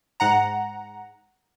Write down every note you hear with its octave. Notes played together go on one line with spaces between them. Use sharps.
G#2 F#5 A#5